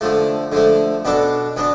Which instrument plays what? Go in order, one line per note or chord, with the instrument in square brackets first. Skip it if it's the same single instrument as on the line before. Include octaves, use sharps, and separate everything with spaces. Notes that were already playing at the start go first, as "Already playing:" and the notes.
[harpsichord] D3 F3 A3
D3 F3 A3
B2 B3 D4 A4
B2 B3 D4